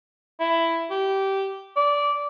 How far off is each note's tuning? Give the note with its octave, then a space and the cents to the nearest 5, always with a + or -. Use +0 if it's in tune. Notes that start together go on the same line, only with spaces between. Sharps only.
E4 +10
G4 -15
D5 -15